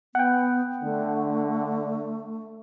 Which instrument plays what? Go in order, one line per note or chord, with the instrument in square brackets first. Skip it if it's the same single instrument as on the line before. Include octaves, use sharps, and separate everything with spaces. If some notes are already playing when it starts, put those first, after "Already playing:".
[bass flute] B3 [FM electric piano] F#5 G5
[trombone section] D3 [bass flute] A3